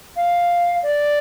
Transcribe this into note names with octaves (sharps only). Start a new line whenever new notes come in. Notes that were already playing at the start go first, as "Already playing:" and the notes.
F5
D5